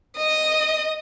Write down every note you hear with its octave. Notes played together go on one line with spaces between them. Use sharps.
D#5 D#6